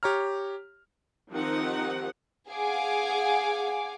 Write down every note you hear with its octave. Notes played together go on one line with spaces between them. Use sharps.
G4 C#5 A#5 F6
D#3 F3 C4 D#4 G4 F#5
G#4 F5 F#5 G#5 D6